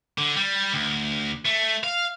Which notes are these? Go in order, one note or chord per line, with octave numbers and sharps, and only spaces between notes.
D3
G3
D2
A3
F5